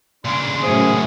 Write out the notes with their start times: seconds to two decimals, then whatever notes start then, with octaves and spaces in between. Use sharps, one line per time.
0.25 A#2 C#3 D4 C6
0.63 F#2 A2 C#4 G#4 C5